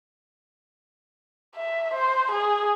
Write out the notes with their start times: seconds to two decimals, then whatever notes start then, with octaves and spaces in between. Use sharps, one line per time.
1.56 E5
1.93 C5
2.31 G#4